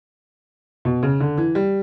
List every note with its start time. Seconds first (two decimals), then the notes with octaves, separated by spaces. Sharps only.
0.85 B2
1.03 C#3
1.20 D3
1.38 E3
1.55 G3